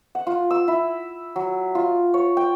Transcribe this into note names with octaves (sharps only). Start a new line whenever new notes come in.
F#5
F4
E6
E4
F#3
F4
C#5
G5